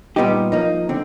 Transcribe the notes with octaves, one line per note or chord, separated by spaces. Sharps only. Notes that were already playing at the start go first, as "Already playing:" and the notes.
A#2 G3 B3 D#4 G4
F3 A#3 D#4
D3 C4